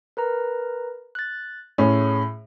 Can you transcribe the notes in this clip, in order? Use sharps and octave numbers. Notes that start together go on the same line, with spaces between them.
A#4 B4 A#5
F#6 A6
A2 C#4 G#4